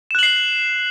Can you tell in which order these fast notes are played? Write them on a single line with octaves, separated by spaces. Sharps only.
E7 F#6 F#7 C7